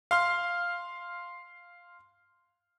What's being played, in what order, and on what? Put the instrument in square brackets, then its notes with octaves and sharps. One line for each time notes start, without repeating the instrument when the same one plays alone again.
[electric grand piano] F5 C6 F6